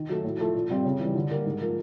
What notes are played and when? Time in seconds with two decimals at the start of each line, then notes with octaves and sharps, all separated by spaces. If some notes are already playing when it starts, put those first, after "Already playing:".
Already playing: D#3
0.09 F#3 A3
0.24 A2
0.40 F3 A3
0.54 A#2
0.70 G3 C4 F4
0.85 C#3
1.00 E3 G3
1.15 D3
1.30 G3 A#3
1.45 G#2
1.61 F3 A#3